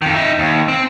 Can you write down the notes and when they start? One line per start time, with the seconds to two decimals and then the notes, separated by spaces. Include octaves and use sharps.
0.02 F2 D#3
0.15 D#4 E5
0.39 D#2
0.68 C4